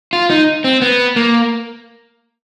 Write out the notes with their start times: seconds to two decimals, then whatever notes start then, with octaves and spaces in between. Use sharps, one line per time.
0.13 F4
0.30 D#4
0.64 C4
0.82 B3
1.16 A#3